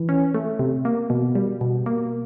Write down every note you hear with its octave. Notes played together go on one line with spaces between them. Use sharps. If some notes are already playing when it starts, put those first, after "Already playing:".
Already playing: E3
C#4
A3
C3
A#3
B2
G3
B2
A#3